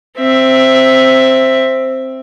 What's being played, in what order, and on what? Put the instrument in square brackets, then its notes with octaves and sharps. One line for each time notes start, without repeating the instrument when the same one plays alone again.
[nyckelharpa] C4 E5